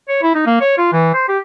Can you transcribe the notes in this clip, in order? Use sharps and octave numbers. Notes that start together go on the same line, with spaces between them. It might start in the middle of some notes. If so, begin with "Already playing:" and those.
C#5
E4
D#4
A#3
C#5
F4
E3
C5
G4